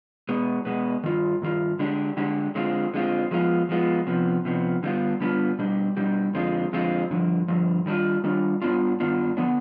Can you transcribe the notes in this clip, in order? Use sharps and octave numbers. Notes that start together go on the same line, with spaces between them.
B2 G#3 B3
B2 G#3 B3
G2 D#3 F4
G2 D#3 F4
D3 G#3 D4 G4
D3 G#3 D4 G4
D3 G#3 C4 F4
D3 G#3 C4 F4
F3 G#3 B3 F4
F3 G#3 B3 F4
C3 F3 B3
C3 F3 B3
D3 G3 B3 D4 F4
D3 G3 B3 D4 F4
B2 G3 D4 G4
B2 G3 D4 G4
F2 D3 G#3 C4 F4
F2 D3 G#3 C4 F4
G2 D3 F3
G2 D3 F3
D#3 G3 D4 F4
D#3 G3 D4 F4
G2 D#3 B3 D4 F4
G2 D#3 B3 D4 F4
D3 F3 B3 D4